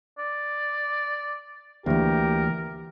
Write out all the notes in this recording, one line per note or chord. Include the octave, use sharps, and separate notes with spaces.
D5
D2 E3 A#3 G4 A#4